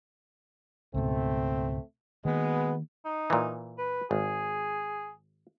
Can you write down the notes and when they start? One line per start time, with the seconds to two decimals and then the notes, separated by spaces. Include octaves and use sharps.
0.94 C#2 G#2 B2 A3 C4
2.25 B2 D#3 G#3 A#3 B3
3.05 D#4
3.30 A#2 E3
3.78 B4
4.11 G#1 G#4